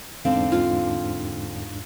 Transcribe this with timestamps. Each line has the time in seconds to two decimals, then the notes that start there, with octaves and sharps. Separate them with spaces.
0.25 E2 G#2 D3 C4 D4 F5
0.52 F4